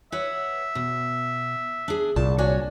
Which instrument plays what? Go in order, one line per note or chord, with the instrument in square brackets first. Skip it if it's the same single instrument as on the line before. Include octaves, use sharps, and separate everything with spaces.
[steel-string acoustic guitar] B4 C#5 F#5 [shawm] E5
[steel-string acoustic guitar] B2
D4 G#4
[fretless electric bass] C2 [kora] A#2 [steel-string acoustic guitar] A5
[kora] D4 [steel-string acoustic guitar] F#4 C#5 G#5